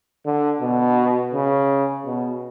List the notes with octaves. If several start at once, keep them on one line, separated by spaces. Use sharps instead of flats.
D3
B2
C#3
B2